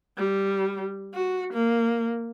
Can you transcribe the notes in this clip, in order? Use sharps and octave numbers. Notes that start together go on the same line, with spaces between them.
G3
F#4
A#3